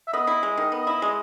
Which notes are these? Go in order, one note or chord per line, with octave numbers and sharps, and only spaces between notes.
E5
B3 D#5
E4
G#3
D#3
B3
E4
G#3